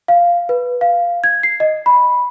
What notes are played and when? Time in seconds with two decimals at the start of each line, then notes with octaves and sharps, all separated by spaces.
0.08 F5
0.49 B4
0.81 F5
1.24 G#6
1.43 C7
1.60 D#5
1.86 B5